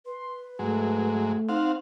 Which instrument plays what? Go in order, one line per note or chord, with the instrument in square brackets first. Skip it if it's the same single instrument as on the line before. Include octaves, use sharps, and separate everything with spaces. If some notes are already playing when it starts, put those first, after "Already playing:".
[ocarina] B4 [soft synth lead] C6
[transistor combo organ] G#2 F#3 G#3 [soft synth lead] A3
[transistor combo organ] C4 F5 F#5 [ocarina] D#4